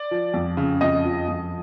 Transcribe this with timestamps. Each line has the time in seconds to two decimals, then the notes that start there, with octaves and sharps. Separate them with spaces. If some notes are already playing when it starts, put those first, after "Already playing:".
Already playing: D5
0.11 F3
0.34 F2
0.57 C#3
0.81 F2 D#5
1.05 F3
1.28 F2